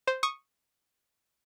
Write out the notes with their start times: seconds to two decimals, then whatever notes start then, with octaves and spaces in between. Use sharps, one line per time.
0.07 C5
0.23 C#6 D#6